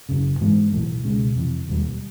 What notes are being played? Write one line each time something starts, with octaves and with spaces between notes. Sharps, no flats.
F#1 F#2 C#3
G#2 E3 G#3 B3
B1 A2 E3 A3
C#2 B2 G#3 C#4
F2 C3 E3
E1 D#2 D#3 G3